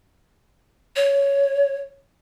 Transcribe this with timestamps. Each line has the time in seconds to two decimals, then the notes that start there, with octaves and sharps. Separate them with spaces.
0.96 C#5